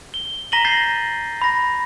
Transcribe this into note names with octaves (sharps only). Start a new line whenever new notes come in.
G7
A#5 A#6 B6 D#7 F#7 G7
G6 A6 A#6 C7 G7
B5 A#6